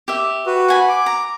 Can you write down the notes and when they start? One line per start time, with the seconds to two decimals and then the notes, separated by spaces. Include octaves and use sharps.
0.08 G4 E5
0.46 F#4 B4
0.68 F#5 G#5 B5
0.89 D6
1.06 A#5